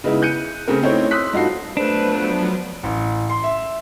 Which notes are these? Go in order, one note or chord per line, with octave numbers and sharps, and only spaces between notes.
C#3 G#3 B3 D#4 E4
F#6 G6 C#7 D#7
C#3 A3 C4 C#4 A#4
A3 C4 D#4 E4 C#5 G5
C6 D#6 E6 F#6 B6
G2 D#4 F4 F#4 A4 C7
F3 F#3 A3 B3 D4 B4 C5
A1
C6
E5